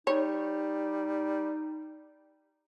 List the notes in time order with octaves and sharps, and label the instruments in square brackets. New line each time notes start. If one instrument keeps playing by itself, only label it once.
[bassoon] G3 [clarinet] D#4 [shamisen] C#5